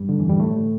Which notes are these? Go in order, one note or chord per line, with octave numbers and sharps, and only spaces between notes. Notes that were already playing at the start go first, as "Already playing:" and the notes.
Already playing: G2 G3
D3
E2 E3
G2 G3
A2 A3